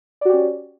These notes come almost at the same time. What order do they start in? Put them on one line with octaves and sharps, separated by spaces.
D5 F#4 G4 C#4